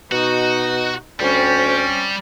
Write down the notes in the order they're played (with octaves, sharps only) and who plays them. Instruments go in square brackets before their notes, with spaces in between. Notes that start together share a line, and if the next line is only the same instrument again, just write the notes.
[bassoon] B2 [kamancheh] D#4 D#5 [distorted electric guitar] F#4
[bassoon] D2 [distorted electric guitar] G3 [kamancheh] C4 C#4